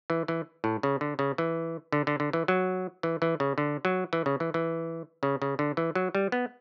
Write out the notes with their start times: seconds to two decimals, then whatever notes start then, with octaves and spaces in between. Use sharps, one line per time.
0.10 E3
0.28 E3
0.64 A2
0.83 C#3
1.01 D3
1.19 C#3
1.38 E3
1.92 D3
2.07 D3
2.20 D3
2.33 E3
2.48 F#3
3.03 E3
3.22 E3
3.40 C#3
3.58 D3
3.85 F#3
4.13 E3
4.26 C#3
4.40 E3
4.54 E3
5.23 C#3
5.42 C#3
5.59 D3
5.77 E3
5.95 F#3
6.15 G3
6.32 B3